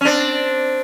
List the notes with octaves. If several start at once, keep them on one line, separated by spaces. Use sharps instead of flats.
C#4
C4 D4